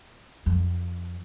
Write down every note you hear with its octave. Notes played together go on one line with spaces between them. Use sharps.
F2